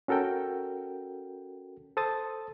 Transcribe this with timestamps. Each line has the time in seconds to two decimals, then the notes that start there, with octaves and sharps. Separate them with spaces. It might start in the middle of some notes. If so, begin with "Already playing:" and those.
0.08 C#4 F#4 A4 A#4 G5
1.97 A4 C5 A5 D#6 A6